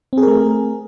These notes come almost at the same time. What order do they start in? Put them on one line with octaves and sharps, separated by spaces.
C4 G#4 A#4 A3